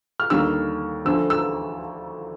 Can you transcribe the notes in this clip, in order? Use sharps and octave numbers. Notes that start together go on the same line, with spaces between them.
F6
D#2 D3 G3 A#3 E6
D2 D3 F3 E6
E6